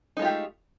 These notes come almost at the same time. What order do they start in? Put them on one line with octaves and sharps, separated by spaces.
D#4 G#3 F4 G4 A3